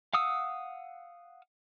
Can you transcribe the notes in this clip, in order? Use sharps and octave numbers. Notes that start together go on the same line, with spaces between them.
F5 F#5 D#6 E6